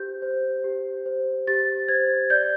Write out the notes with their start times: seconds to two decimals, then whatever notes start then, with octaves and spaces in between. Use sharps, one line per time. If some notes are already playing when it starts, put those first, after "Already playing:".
Already playing: G4 C5 G6
0.22 C5
0.64 G4
1.06 C5
1.47 G4 A6
1.88 C5 G#6
2.30 D5 G6